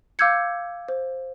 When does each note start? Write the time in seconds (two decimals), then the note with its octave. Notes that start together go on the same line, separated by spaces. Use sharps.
0.19 F5 D6 E6 G6 G#6 C#7
0.88 C5